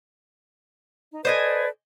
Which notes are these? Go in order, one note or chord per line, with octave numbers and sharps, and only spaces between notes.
D#4
A4 B4 C5 D5 D#5 G#5